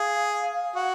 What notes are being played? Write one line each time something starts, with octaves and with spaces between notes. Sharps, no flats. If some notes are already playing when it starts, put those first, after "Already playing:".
Already playing: G#4 F5
F#4